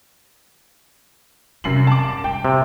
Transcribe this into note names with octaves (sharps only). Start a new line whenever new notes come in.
F#2 C3 G3 C7 F#7
A5 D6
G#2
G3 G5
C3